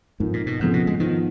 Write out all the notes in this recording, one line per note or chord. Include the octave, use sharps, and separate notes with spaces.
F2 G#2 F3 A#3 D#4
A#2
B2
F2 G#2 C#3 F3 B3
B2
G#3
G#2 D#3 F3 B3